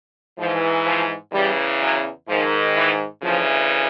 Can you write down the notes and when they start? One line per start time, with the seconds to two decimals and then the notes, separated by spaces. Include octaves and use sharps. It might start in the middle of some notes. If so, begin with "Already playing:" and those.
0.37 G#2 E3 F3
0.85 F3
1.32 E2 C#3 E3 G3
1.80 F#3
2.28 G#2 D#3 F3
2.75 E3
3.23 D2 C#3 E3 F3